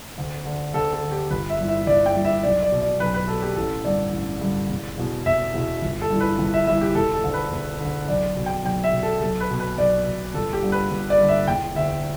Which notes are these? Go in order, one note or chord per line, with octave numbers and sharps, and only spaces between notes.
D2
D3
D2 A4
A4
D3
G4
G1 B4
E5
G2 E3
E5
G1 D5
G5
G2 E3
E5
B1 D5
D5
B2
D5
B1 B4
B4
B2 A4
G4
A1 A4
G2 D3 D5
A1
G2 D3
E1
E2 B2
E1 E5
E2 B2
G1
A4
G2 E3
B4
G1
E5
G2 E3 E5
G4
E1 A4
A4
D2 D3
B4
E1
D2 D3
B1 D5
B2
G5
B1 G5
E5
B2
A4
B1 A4
B4
B2
B4
B1 D5
B2
G1 A4
G4
G2 D3
B4
G1
D5
G2 D3
E5
E1 G5
D2 D3 E5